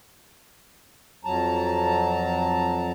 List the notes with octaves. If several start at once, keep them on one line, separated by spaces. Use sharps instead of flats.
F2 F#3 A5 A#5